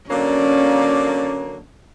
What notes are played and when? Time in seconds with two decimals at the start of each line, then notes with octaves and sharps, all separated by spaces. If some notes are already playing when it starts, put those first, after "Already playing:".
0.10 D3 F#3 A#3 C#4 D5